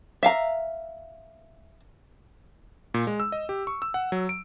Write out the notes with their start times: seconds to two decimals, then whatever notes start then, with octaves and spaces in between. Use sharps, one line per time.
0.23 E5 F5 A#5
2.94 A#2
3.07 G#3
3.20 E6
3.32 D#5
3.49 G4
3.67 C#6
3.82 E6
3.94 F#5
4.12 F#3
4.29 D7